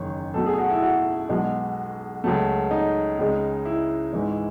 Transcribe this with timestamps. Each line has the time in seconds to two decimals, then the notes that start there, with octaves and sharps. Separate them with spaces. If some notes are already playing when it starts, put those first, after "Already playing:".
Already playing: F#1 E2 D#3 C#5
0.34 B1 B2 A3 A4
0.46 G#4
0.58 F#4
0.70 E4
0.83 F#4
1.29 B1 B2 G#3
2.24 C#2 C#3 F#3 A3
2.71 D#4
3.19 C#2 C#3 G#3
3.65 E4
4.13 G#1 G#2 E3 G#3